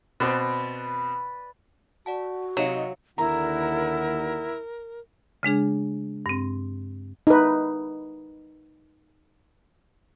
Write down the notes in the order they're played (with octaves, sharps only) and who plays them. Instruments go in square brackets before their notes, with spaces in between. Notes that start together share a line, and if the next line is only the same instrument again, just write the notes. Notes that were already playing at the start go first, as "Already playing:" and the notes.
[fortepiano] B2 C4 [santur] B4 D5
[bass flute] F#4 [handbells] D5 F#5 A5
[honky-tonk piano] C3 D#4 [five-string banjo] F#3 [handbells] D#5 F5 C#7
[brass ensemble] D#2 D3 F#5 [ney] E4 [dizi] A#4 [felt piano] A#5
[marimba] C#3 G#3 D4 G#4
G2 C4
[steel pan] D#4 B4